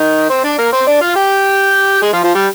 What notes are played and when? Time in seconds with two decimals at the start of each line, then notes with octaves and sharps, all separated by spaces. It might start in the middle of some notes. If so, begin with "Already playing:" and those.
Already playing: D#3 D#4
0.30 C4 C5
0.44 D4 D5
0.58 A#3 A#4
0.72 C4 C5
0.87 D4 D5
1.01 F4 F5
1.16 G4 G5
2.02 G#3 G#4
2.13 F3 F4
2.24 F3 F4
2.35 G3 G4